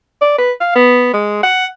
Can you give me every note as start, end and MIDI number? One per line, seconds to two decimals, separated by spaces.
0.21 0.34 74
0.38 0.52 71
0.61 0.71 77
0.75 1.09 59
1.13 1.41 56
1.43 1.65 78